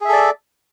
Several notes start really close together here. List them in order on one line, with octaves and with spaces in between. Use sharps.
G#4 E5 A4 D5